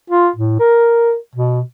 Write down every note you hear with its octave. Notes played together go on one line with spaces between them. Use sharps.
F4
A2
A#4
B2